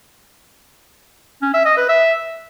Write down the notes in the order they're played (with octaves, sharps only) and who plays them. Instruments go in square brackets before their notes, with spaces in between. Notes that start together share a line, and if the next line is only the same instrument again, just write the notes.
[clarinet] C#4
E5
D#5
B4
E5